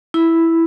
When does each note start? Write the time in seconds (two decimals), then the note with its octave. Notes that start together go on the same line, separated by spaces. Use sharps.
0.14 E4